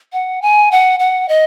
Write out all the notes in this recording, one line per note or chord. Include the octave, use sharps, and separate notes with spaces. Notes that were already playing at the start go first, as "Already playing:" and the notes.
F#5
G#5
F#5
F#5
D#5